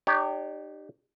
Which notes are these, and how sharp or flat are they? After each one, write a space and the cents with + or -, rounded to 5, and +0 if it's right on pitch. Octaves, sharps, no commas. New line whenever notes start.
D#4 -40 G4 +0 C#5 +25